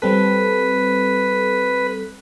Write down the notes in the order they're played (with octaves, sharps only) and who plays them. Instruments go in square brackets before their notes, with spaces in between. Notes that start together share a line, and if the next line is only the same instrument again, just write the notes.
[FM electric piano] G3 C4 A4 [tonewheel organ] B4